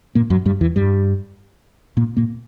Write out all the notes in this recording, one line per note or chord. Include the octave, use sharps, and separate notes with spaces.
A#2 A#3
F#2 F#3
G2 G3
E2 E3
G2 G3
A#2 A#3
A#2 A#3